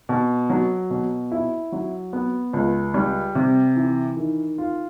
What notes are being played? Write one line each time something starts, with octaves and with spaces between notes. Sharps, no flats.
B2
F#3
B2
E4
F#3
B3
C#2
G3
C3
E3
D#3
F4